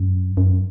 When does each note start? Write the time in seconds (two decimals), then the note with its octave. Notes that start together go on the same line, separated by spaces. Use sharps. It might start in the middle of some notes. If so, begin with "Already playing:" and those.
Already playing: F#2
0.37 F#2